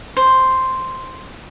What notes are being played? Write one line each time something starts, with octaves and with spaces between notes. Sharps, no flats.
C5